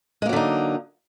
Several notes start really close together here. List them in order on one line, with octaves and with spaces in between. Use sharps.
G#3 A#3 F#3 D3 D#4